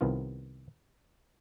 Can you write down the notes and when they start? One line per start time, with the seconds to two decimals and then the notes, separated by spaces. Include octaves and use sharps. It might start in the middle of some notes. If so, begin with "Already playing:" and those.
0.01 C2 C3 D#3 B3 F4